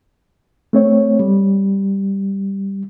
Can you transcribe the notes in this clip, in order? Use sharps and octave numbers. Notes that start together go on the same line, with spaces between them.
A3 C4 C#5
G3